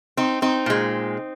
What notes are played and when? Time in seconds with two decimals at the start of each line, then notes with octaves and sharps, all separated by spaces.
0.17 C4 D#4
0.42 C4 D#4
0.66 A#2 G#3